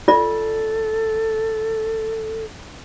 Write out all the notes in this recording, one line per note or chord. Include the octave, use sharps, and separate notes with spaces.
F4 A4 D5